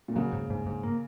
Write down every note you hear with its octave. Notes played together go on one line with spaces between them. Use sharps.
A#2
C#3 F#3
G#2
G#2
G#2
A#3